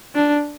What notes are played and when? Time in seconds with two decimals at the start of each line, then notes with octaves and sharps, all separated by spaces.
0.15 D4